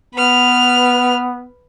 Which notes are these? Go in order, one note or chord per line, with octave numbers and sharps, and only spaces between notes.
B3 B4 F6